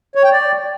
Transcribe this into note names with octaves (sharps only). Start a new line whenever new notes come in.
C#5
G5
D5